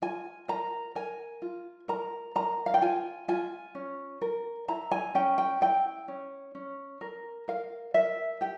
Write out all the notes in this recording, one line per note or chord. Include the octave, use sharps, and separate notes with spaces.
F4 G#5
A#4 A#5
A#4 G#5
F4
A#4 A#5
A#4 A#5
F5
G5
F4 G#5
F4 G#5
C#4
A#4
E4 A#5
G#5
C#4 G5
G5
E4 G5
C#4
C#4
A#4
A#4 F5
A#4 E5
G4 G5